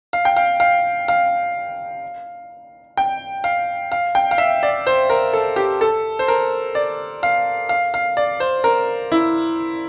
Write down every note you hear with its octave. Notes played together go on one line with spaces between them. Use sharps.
F5
G5
F5
F5
F5
G5
F5
F5
G5
F5
E5
D5
C5
A#4
A4
G4
A4
C5
A#4
D5
F5
F5
F5
D5
C5
A#4
E4